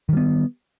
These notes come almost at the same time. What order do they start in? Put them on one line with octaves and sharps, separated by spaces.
D#3 G3 B3